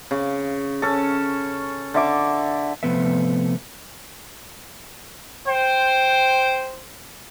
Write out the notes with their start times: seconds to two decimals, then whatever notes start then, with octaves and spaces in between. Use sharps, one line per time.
0.11 C#3
0.82 C#4 A4
1.94 D3 E5 D6
2.83 C3 F3 A3 B3 B4 E5
5.48 C5 G5